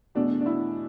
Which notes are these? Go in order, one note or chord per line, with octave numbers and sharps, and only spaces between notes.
E2 B2 A3 D4
D4
E4